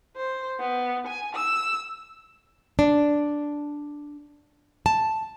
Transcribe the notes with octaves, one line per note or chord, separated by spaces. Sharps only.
C5
B3
G#5
E6
D4
A5